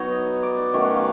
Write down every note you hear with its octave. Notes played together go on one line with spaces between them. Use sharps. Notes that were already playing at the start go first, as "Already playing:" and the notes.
Already playing: F#3 B3 D#4 C#5 D#5
D5
D5
D#3 F#3 A3 C#4 C#5
F#5
F5